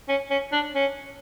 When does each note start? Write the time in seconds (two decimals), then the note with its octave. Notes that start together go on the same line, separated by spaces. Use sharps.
0.09 C#4
0.31 C#4
0.52 D4
0.75 C#4